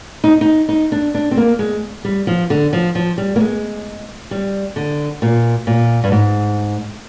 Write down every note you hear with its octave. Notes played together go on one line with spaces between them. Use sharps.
D#4
D#4
D#4
D4
D4
C4
A#3
G#3
G3
F3
D3
F3
F3
G3
A#3
G#3
G3
D3
A#2
A#2
G2
G#2